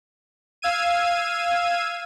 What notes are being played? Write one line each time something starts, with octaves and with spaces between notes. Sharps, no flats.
F5 E6 G#6 D#7